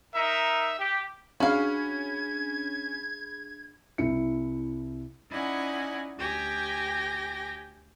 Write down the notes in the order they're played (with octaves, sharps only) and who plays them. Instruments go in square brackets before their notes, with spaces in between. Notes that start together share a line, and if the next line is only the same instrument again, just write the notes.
[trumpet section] D#4 A#4 E5
G4
[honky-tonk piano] C#4 [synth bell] D4 G#4 B5 [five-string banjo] F#4 F5 [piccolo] G#6
[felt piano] C2 E4 C#7
[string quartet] C#4 D#4 E4 D5 F#5 G#5
D2 G4 G5 G#5 A#6